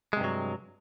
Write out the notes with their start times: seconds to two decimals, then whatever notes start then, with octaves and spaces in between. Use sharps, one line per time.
0.13 G#3
0.17 C3
0.20 G2
0.24 F#3